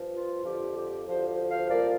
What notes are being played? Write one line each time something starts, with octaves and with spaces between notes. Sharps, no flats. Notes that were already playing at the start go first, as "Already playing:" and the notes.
Already playing: G2 F3
F4
F2 D3 F3 G4
G4
D2 D3 F3 G4 C5
C5 F5
C2 A#2 F3 A#4 D5